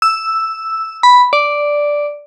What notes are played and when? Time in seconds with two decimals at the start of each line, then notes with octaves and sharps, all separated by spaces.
0.02 E6
1.03 B5
1.33 D5